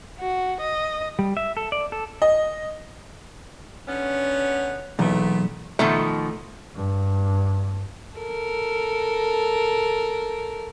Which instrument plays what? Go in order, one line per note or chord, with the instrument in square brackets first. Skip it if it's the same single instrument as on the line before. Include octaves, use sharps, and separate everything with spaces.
[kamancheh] F#4
D#5
[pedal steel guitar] G3
E5
A4
D5
A4
[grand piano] D#5
[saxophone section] D3 B3 C#4
[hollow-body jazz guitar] B1 E2 [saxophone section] A#2 A3 B3
[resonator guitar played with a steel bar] B2 D#3 F3 [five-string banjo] A3
[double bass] G2
[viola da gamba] A4 A#4